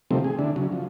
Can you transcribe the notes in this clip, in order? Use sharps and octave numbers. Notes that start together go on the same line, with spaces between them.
C3 D#3 F3 G3 A3 C4
G#4
D3 D4 E4
C#3 F#3
F3